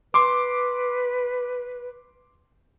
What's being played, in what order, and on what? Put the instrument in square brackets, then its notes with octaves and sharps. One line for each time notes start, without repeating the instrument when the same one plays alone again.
[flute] B4 [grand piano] C6 D6